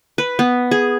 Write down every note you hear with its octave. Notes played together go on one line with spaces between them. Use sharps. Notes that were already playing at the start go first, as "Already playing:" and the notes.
B4
B3
G#4